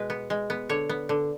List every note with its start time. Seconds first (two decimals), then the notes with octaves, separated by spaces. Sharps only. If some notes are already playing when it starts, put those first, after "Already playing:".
Already playing: B2 G#3 B4
0.10 B3
0.30 G#3
0.50 B3
0.69 D3 C#5
0.89 B3
1.09 D3